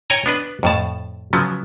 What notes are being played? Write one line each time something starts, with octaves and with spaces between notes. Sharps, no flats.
C#5 G5 G#5 A#5
B3 D4 B4
F2 A2 A5
C#3 F3 F#3 B3